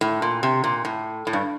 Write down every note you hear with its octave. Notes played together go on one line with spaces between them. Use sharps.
A2
A#2
C3
A#2
A2
A2
G2